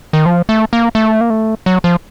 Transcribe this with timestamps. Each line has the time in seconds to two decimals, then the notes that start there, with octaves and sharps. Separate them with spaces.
0.13 D#3
0.26 F3
0.49 A3
0.73 A#3
0.95 A3
1.21 A#3
1.30 A3
1.66 F#3
1.84 F3